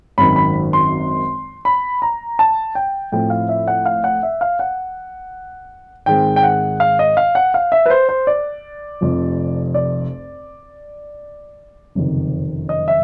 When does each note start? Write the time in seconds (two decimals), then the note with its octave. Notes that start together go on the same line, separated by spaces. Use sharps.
0.18 G#1 F#2 D#3 B5
0.36 B5
0.73 C6
1.65 B5
2.02 A#5
2.39 A5
2.75 G5
3.12 A2 F3 A3 C4 E4 G5
3.30 F5
3.49 E5
3.68 F#5
3.86 F5
4.04 F#5
4.23 E5
4.41 F5
4.59 F#5
6.06 G#2 D#3 G#3 C4 G5
6.36 G5
6.43 F#5
6.80 F5
6.99 D#5
7.17 F5
7.35 F#5
7.54 F5
7.72 E5
7.86 B4
7.90 C5
8.09 C5
8.27 D5
9.01 F1 F2 C3 F3
9.74 D5
11.95 F#1 F2 C3 D#3
12.69 D#5
12.88 E5